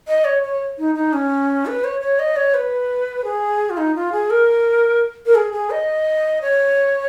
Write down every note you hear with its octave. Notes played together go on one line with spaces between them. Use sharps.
D#5
C#5
C#5
D#4
D#4
C#4
B4
C#5
C#5
D#5
C#5
B4
G#4
F4
D#4
F4
G#4
A#4
A#4
G#4
G#4
D#5
C#5